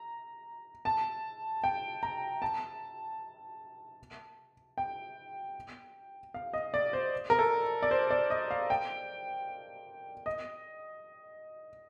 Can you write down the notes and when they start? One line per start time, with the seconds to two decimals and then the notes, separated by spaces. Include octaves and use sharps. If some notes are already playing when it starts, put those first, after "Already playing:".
Already playing: A#5
0.85 A5
1.64 G5
2.03 A#5
2.42 A5
4.78 G5
6.34 F5
6.54 D#5
6.74 D5
6.93 C5
7.30 A#4
7.39 A4
7.82 D5
7.91 C5
8.10 D5
8.30 D#5
8.51 F5
8.70 G5
10.26 D#5